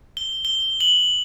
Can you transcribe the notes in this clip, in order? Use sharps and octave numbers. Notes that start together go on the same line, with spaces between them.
G7
G7
F#7